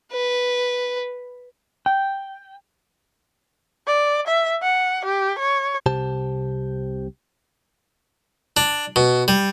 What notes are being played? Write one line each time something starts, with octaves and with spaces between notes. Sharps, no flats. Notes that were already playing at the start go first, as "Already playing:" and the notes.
B4
G5
D5
E5
F#5
G4
C#5
C2 C3 G4 C5 A5
D4
B2
G3